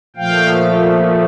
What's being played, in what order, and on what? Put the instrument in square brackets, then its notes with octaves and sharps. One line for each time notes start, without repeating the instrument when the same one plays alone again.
[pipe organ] A#2 F3 A3 F5 G5